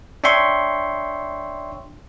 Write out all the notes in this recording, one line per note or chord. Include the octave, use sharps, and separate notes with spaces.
D4 C#5 E5 G5 C6 C#6